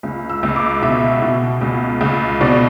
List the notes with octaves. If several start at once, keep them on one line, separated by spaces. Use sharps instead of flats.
C#2
E6
C#2
D6
B2 E5
B2
C#2
C#2
B2 D5